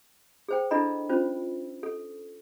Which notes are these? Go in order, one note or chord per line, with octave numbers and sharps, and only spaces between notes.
G#4 C5 G5
D4 E4 A4 D#5 B5
C#4 F4 C5
A4